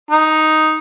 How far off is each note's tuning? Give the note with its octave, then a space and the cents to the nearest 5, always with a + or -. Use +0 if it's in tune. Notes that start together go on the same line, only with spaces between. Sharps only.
D#4 +5